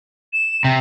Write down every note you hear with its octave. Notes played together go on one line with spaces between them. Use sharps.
E7
C3